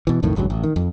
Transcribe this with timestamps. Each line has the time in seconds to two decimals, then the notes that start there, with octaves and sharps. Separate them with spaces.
0.07 B2 E3
0.22 B1 F2 A2 D#3
0.36 G#1 C#2 G2 F#3
0.50 A1
0.63 D#3
0.76 F2